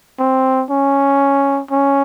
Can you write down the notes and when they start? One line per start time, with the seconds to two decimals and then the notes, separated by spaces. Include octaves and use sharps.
0.19 C4
0.70 C#4
1.71 C#4